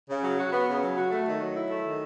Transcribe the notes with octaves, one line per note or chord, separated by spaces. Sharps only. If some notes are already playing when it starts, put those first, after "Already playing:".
C#3
F#3
F#4
B3
C#3
F#3
F#4
A3
D#3
F#3
E4
A3
D#3